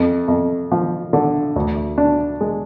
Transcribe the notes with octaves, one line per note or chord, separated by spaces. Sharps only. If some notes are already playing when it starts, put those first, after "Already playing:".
Already playing: F2
F2
F3
D3
D2
D4
G#3